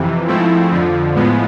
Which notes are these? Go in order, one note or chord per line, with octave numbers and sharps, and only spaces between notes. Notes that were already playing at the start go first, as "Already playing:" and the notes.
Already playing: F2 C3 E3
G#2 F3 A3 C4 E4
F2 D3 F3
A2 F3 G#3 B3